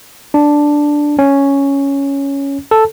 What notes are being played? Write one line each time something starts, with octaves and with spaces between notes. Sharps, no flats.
D4
C#4
A4